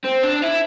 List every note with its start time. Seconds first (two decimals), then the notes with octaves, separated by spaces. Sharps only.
0.04 C4
0.23 D4
0.42 E4